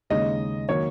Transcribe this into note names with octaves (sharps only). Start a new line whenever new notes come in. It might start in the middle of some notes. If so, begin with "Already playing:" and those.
D#2 C#3 G#3 D#4 D#5
D#3 F#3 A#3 C#5